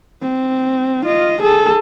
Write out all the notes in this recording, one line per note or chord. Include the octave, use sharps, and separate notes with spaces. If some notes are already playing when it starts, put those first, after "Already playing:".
C4
F4 D#5
G#4 A4